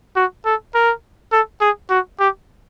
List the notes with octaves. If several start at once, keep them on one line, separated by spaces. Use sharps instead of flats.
F#4
A4
A#4
A4
G#4
F#4
G4